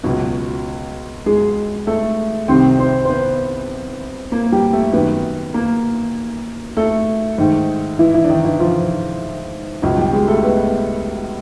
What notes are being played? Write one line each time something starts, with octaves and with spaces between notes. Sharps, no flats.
C#2 B2 F#3 F#4
G#3 G#4
A3 A4
C2 C3 D#3 C4 C5
C4 C5
C5
B3 B4
A#3 A#4
G3 G4
A3 A4
F#2 D#3 B3 B4
A#3 A#4
A3 A4
G#2 D#3
E3 E4
E3 E4
D4
D#3 D#4
E3 E4
F3 F4
C#2 B2 F#3 F#4
G3 G4
G#3 G#4
A3 A4
B3 B4